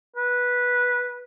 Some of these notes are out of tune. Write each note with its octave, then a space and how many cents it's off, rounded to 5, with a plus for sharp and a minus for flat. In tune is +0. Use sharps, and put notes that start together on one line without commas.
B4 -10